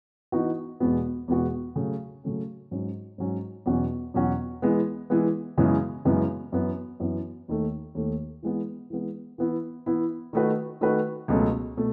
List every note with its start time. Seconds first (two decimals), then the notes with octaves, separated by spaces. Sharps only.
0.32 E3 B3 D#4 F#4
0.80 E2 B2 G#3 B3 F#4
1.28 E2 B2 G#3 B3 F#4
1.76 C#3 F#3 A3 C#4
2.24 C#3 F#3 A3 C#4
2.71 G#2 F#3 C#4
3.18 G#2 F#3 C#4
3.66 E2 B2 F#3 C#4 F#4
4.14 E2 B2 F#3 C#4 F#4
4.62 E3 G#3 B3
5.10 E3 G#3 B3
5.58 F#2 C#3 E3 G#3 B3
6.05 F#2 C#3 E3 G#3 B3
6.52 F#2 E3 B3
7.00 F#2 E3 B3
7.48 D#2 D#3 A3
7.95 D#2 D#3 A3
8.43 E3 G#3 B3
8.90 E3 G#3 B3
9.38 E3 B3 E4
9.86 E3 B3 E4
10.33 D#3 A3 D#4 F#4 B4
10.81 D#3 A3 D#4 F#4 B4
11.28 C#2 B2 F#3 A3 C#4
11.77 B2 A3